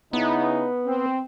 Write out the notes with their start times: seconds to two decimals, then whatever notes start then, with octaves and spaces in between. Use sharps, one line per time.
0.13 C#3 B3 D#4 E4
0.86 C4